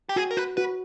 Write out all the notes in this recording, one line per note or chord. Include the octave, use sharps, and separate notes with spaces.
G4
F#4 G#4
A#4
F#4 B4
F#4 B4